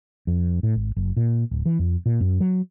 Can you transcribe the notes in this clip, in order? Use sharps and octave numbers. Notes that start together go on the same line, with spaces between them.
F2
A2
G#1
F#1
A#2
D1
E3
F2
A#2
F#2
F#3